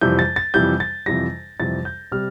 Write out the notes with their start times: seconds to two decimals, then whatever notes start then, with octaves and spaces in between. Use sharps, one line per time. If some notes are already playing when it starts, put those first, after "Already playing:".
0.01 F2 C3 E3 G3 G6
0.19 A6
0.36 A6
0.54 F2 C3 E3 G3 G6
0.80 A6
1.06 F2 C3 E3 G3 A#6
1.60 F2 C3 E3 G3 A6
1.85 G6
2.12 C3 G3 F6